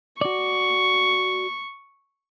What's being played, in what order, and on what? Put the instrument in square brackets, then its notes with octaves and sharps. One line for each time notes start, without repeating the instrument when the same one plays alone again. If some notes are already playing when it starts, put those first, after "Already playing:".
[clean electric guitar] F#4 D5 [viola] C#6